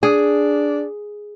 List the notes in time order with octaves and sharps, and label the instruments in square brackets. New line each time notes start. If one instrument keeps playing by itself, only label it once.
[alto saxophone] D4 [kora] G#4